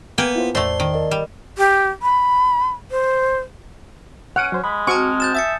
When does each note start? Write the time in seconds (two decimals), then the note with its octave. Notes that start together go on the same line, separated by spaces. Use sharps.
0.18 A#3 B3 G5 G#5
0.35 E4 F4 C5
0.55 E2 A2 A3 C5 D5 A5 C6
0.80 D#3
0.94 A#4 D5 D#5
1.11 G3
1.58 G4
2.02 B5
2.91 C5
4.36 C#4 F#5 F6 D7 D#7
4.52 F#3 C5
4.64 G#3 B5
4.87 C4 F#4 G#5 A5 C#6 F6
5.20 G6 A6 E7
5.35 E5 D#6 A6 C#7